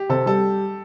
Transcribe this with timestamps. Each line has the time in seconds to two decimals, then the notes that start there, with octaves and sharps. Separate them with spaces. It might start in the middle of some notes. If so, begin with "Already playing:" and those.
Already playing: G4
0.10 C3 A4
0.26 G3 A4